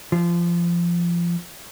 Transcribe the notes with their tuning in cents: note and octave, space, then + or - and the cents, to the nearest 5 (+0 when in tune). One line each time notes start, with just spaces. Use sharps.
F3 -20